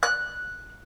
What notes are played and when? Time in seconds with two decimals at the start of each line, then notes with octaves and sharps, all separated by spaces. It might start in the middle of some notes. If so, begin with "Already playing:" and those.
0.03 F#6